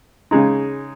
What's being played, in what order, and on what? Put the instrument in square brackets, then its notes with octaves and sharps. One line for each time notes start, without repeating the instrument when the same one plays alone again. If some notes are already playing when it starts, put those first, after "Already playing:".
[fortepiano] C#3 G#3 D#4